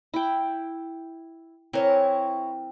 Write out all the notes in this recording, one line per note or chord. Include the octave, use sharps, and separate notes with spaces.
E4 G5
E3 C4 E4 A#4 C#5